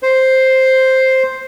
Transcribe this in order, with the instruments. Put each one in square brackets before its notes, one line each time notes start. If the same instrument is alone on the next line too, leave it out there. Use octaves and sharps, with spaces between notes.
[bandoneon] C5